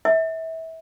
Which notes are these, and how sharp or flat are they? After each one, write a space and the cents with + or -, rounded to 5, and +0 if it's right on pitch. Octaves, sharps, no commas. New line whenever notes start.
E5 -25